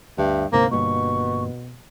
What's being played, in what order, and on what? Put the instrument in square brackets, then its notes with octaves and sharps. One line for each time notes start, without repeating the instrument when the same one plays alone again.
[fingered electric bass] D2 [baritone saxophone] G2 [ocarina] E5
[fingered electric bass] D2 G#2 C3 [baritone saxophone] A#3 [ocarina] C5
[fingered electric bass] G1 G2 A#3 [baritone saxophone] B2 [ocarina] C#6